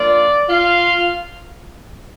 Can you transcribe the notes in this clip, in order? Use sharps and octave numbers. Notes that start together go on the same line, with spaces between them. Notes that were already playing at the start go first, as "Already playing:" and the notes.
Already playing: F3 A#3 D4 F4 D5
F4 F5